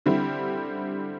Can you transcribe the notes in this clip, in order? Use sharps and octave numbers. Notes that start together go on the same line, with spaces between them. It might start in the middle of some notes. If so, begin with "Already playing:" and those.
D3 G3 C4 E4